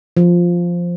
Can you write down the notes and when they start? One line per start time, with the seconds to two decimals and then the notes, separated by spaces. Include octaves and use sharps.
0.17 F3